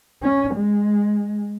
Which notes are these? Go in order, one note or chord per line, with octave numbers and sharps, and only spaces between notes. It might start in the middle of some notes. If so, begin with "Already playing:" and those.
C#4
G#3